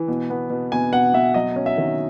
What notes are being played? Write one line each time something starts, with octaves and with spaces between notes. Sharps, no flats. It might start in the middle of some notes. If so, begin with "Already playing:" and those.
Already playing: E3
B2
B3
B2
B2 G#5
B2 F#5
B2 E5
F#3 D#5
C#4
E5
D#3